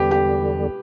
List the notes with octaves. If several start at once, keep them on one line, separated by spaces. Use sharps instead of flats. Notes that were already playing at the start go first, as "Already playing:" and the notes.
Already playing: E2 D3 G3 B3 G4
G4